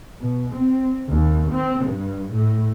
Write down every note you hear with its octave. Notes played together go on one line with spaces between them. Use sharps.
B2
C4
D#2
C4
G2
A2